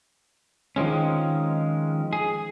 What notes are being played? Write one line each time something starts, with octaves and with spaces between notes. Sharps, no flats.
D#3 F3 G#3 C#4
G#4